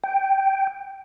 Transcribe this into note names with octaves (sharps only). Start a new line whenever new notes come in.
G5